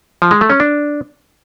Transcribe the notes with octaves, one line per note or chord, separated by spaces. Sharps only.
F3
G#3
A3
C#4
D4